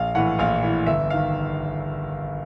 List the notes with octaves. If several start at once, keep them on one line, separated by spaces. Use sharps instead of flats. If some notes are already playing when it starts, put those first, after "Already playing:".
Already playing: A#1 F5
A2 E3 F#5
A#1 F5
A2 E3
G1 E5
D#3 F5